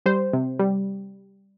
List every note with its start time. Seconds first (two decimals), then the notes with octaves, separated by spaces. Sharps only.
0.06 G3 C5
0.33 C3
0.59 G3